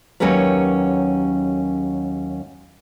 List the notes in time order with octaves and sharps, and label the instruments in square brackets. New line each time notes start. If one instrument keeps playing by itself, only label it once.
[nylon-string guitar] D#2 F#3 C#4 G4 A#4 B4